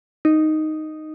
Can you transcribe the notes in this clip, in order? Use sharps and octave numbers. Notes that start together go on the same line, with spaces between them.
D#4